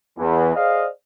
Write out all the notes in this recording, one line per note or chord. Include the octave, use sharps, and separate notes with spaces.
E2 E3
G#4 C5 D5 D#5 F5